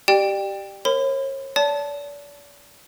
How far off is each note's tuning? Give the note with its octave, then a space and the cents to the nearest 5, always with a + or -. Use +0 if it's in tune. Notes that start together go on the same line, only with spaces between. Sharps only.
G4 -10 D5 +30 G5 +10
A#4 +0 C#5 -35 B5 +40
D5 -35 A5 +0